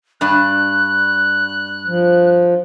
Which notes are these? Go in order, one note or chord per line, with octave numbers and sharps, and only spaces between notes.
G2 D4 F#6
F3